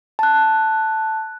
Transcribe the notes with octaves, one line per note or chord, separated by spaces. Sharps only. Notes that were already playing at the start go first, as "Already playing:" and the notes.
A5 F#6